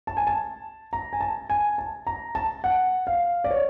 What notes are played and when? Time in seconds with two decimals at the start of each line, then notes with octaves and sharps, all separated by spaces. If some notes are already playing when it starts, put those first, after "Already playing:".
0.07 A5
0.17 G#5
0.27 A5
0.93 A#5
1.13 G#5
1.21 A5
1.50 G#5
1.78 A5
2.07 A#5
2.35 A5
2.64 F#5
3.07 F5
3.44 D5
3.51 C#5